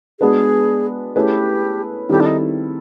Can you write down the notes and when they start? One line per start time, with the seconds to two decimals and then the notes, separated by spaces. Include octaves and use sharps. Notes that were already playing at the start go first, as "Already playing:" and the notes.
0.20 G#3 B3 D4 F#4 G#4 B4
1.16 A3 C#4 E4 G4 G#4 B4
2.09 D#3 G3 C4 E4 G4 A4
2.20 D4
2.26 D#4